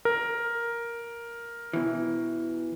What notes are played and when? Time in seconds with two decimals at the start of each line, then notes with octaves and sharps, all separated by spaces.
0.05 A#4
1.73 B2 E3